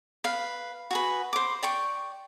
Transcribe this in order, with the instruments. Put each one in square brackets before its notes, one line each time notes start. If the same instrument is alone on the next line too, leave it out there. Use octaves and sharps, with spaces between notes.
[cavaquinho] B4 F5
F#4 G#4 B4
C5 D6
D5 G5 C#6